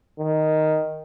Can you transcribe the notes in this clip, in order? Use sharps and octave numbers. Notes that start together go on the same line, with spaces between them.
D#3